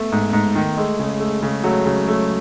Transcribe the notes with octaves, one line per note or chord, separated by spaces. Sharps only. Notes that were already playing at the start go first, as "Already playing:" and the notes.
Already playing: A3 B3
G#2
G#2
D#3
G#3 A3
C#3
A3
C#3
F#3 A3
C#3
A3